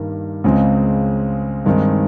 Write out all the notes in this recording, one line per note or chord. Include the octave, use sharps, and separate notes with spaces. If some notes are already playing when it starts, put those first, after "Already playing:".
Already playing: G2 D#3 G3 A#3
C#2 C#3 G#3 C4
G2 D#3 G#3 C4 D#4